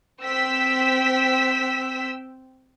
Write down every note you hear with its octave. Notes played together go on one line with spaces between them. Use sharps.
C4 G5 E6 B6